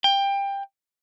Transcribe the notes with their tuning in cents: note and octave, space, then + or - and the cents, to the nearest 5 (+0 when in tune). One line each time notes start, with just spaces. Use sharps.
G5 +20